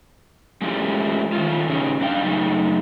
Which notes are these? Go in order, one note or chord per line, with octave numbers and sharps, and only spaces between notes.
G#3 A3 C#4 E4 F4 G4
D#3 A3 F4
A2 C#3 C#4 D#4 G4
G2 D4 F5 G5
F#2 C#3 A3 D#4